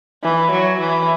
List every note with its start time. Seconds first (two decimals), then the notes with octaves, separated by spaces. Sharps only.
0.24 E3
0.52 F#3
0.80 E3